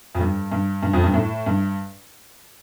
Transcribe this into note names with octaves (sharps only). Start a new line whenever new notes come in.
F2
G2
G2
G2
F2
G2
A2
G2